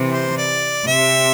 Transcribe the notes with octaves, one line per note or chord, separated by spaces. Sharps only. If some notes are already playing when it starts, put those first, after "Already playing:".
Already playing: C3 E3
C5
D5
C3 E5